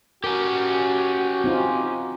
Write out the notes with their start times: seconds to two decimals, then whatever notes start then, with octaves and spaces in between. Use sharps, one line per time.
0.24 C#4 F#4 G4 A#4
1.44 C4 D#4 F4